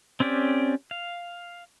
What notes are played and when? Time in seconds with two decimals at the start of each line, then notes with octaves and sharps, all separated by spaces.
0.20 C4 C#4 G4 D5
0.91 F5